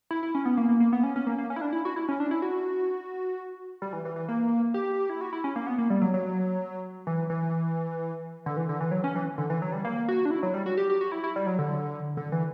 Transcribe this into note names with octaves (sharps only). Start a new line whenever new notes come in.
E4
E4
C#4
B3
A#3
A#3
A#3
B3
C#4
C#4
A#3
A#3
C#4
E4
D4
E4
F#4
E4
C#4
D4
E4
F#4
G3
E3
E3
E3
A#3
G4
E4
F#4
E4
C#4
A#3
B3
A#3
G3
F#3
F#3
E3
E3
D3
E3
D3
E3
F#3
C#4
E3
D3
E3
F#3
G3
A#3
F#4
D4
E4
F#3
G3
F#4
G4
G4
F#4
E4
E4
G3
F#3
D3
D3
E3